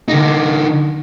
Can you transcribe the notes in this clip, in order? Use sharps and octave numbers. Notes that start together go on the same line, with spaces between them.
D3 D#4